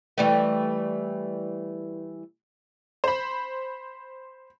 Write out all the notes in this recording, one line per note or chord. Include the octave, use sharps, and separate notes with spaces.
E3 G3 A3
C5 B5